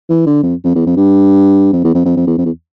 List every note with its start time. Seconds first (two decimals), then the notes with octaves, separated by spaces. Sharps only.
0.10 E3
0.26 D3
0.43 F2
0.64 F2
0.75 E2
0.86 F2
0.97 G2
1.73 F2
1.84 E2
1.94 F2
2.05 F2
2.16 F2
2.27 E2
2.38 F2
2.46 E2